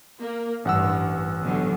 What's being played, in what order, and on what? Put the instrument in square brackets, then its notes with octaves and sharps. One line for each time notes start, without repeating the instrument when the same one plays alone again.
[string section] A#3
[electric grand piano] A1 F#5 E6 [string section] G2
[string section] B2 D3 F#3